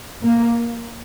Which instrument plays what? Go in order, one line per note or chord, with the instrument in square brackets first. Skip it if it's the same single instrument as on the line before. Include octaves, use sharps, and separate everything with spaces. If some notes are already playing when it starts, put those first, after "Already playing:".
[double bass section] A#3